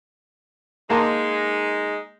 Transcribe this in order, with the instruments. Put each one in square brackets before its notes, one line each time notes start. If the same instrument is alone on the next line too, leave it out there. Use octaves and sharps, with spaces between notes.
[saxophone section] G#3 D#4 [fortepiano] A#3 A5 C6